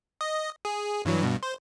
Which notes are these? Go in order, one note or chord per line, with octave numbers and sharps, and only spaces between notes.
D#5
G#4
G2 E3 F#3
G2 B2
C5